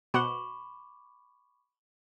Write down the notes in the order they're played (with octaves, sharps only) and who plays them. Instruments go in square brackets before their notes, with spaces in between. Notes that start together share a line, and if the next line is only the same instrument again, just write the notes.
[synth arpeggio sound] B2 C5 F#5 [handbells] B5 C#6 D6